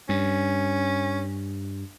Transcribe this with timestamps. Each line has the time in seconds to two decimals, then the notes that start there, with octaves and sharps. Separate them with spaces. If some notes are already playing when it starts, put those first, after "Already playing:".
0.09 G2 C#4